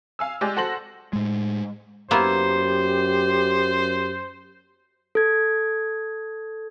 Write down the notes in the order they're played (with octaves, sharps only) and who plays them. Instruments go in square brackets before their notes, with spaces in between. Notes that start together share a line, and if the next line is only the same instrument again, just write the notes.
[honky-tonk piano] F5 G#5 E6
G#3 G4 D5 G#5
F#4 A4 C5 A#6 F#7
[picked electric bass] A2 G#3
[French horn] F#2 [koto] A#3 B3 E4 [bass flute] G4 [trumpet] C5
[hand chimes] A4 G#6